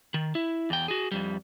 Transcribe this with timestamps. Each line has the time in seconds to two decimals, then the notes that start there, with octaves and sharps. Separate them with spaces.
0.14 D#3
0.35 E4
0.70 E2 G5
0.88 F#4 G#4
1.12 F2 G3